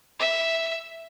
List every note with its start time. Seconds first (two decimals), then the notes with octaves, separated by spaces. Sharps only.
0.20 E5